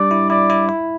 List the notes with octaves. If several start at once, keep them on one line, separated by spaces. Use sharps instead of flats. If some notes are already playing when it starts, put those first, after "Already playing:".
Already playing: G3 D4 D5
E4
E4 D5
E4
E4